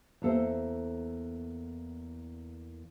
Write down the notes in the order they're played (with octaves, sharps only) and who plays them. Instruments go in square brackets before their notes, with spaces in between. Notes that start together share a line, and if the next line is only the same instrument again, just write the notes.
[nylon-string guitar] E2 A#3 A4 C5 E5